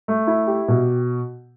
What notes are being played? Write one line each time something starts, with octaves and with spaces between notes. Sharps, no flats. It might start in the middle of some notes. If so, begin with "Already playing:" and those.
A3
E4
G4
B2